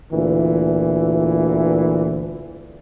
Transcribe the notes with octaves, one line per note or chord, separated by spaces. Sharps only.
D2 A#2 E3